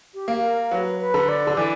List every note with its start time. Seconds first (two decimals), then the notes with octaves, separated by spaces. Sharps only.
0.14 G4
0.28 A#3
0.43 A#4
0.71 F#3 B4
1.00 B4
1.14 D3
1.28 D5
1.47 D3
1.57 E3 D5